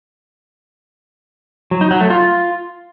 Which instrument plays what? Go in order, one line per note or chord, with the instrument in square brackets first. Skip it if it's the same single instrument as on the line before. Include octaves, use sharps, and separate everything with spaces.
[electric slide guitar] F#3
D#4
F#3
A3
F4